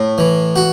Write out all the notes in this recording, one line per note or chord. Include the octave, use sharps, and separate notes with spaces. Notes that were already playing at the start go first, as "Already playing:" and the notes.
Already playing: A2
E3
F#4